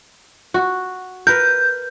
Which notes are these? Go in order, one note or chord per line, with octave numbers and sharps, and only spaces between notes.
F#4
A#4 B4 G6